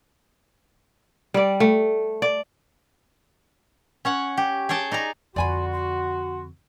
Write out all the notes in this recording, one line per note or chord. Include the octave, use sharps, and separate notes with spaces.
G3 D5
A3
D5
C#4 C#5 F#5
G4
G#4 C#5 G5 A5
D#4 D5 G#5 A#5
F2 D3 F#4 D5 G#5 B5 C6
C6